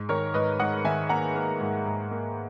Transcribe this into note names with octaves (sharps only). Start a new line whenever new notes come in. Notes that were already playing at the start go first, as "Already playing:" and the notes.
Already playing: G#2
D#3 A#4 C#5
G#2 B4 D#5
G#2 D#5 F#5
D#3 E5 G#5
A#3 F#5 A#5
A#3
G#2
G#2
A#3